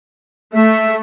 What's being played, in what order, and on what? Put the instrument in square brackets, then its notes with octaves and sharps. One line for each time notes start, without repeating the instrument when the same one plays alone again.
[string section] A3 [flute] E5